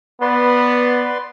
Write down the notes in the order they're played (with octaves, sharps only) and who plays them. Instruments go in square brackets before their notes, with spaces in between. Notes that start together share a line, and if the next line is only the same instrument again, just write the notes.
[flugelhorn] B3 [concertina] B4 D5 C6